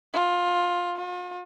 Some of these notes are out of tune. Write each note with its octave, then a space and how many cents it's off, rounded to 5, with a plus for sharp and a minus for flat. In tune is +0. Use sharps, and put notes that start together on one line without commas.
F4 +15
F4 +45